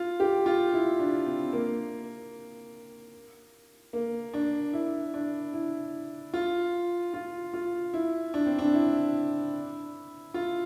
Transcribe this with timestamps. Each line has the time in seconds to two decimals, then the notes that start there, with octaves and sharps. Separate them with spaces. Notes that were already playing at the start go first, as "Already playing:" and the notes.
Already playing: F4
0.20 G4
0.46 F4
0.73 E4
0.99 D4
1.26 C4
1.53 A#3
3.93 A#3
4.33 D4
4.73 E4
5.14 D4
5.54 E4
6.34 F4
7.14 F4
7.54 F4
7.94 E4
8.34 D4
8.46 C4
8.58 D4
8.74 E4
10.34 F4